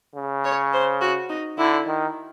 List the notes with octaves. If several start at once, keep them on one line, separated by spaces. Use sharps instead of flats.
C#3
C#5
C5
F#4
D#4
D3 E4
D#3